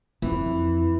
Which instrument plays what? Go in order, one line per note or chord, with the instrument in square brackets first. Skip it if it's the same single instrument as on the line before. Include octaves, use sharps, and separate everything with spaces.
[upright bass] F2 [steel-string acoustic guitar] E3